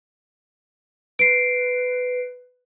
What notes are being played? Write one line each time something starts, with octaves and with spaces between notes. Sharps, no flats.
B4 C7 D7